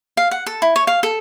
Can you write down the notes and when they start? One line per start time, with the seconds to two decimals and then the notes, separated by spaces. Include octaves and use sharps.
0.17 F5
0.31 F#5
0.46 A4
0.62 E4
0.76 C#5
0.87 F5
1.03 A4